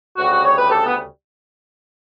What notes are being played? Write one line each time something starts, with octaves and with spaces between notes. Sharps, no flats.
D2 C#3 G3 F#4
F#4
C#5
B4
G4
A4
B3